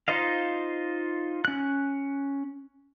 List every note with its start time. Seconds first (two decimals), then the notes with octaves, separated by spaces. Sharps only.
0.08 D#4 F4 C5 D#5 F5
1.45 C#4 F#6